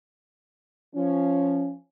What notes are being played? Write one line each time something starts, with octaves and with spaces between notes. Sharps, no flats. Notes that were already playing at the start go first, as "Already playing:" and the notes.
F3 C#4